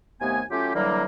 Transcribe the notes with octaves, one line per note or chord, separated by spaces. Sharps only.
D#2 C3 A3 B3 G#5
F#3 A3 C#4 F4 G4
D3 E3 F#3 G3 A#3